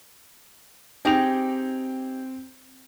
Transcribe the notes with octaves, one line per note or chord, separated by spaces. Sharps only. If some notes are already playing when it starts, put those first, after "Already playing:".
C4 D#4 G4 G#4 G5 F7